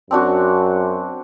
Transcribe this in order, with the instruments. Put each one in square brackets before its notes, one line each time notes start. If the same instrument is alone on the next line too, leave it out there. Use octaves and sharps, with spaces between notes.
[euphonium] F#2 [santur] C4 D4 F#4